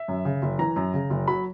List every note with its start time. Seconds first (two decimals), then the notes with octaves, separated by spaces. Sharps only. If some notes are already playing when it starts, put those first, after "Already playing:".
Already playing: E5
0.08 F#2
0.25 C#3
0.42 F#1
0.59 E3 A#5
0.76 F#2
0.94 C#3
1.10 F#1
1.28 F#3 B5